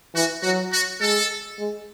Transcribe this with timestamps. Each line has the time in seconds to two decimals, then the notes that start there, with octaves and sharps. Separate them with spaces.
0.15 E3 F#4
0.43 F#3 F#4
0.72 F#4
1.00 G#3 A4
1.59 G#3